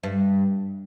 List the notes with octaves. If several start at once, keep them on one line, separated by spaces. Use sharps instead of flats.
G2